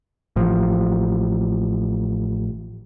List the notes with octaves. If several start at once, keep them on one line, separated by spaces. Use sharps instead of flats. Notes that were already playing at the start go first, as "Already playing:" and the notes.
A1 F3